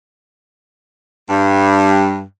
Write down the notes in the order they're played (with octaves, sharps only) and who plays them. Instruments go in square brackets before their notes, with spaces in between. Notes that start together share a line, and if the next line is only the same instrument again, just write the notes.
[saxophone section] G2 G3